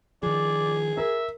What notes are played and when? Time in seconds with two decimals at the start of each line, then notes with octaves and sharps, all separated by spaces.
0.23 D#3 F3 G#4 D5
0.97 A#4 E5